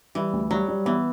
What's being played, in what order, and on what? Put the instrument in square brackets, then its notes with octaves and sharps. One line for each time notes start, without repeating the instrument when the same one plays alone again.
[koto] E3 [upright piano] G3
[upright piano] D2
[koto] F#3 [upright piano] G3
[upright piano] G3
[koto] E3 [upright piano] B3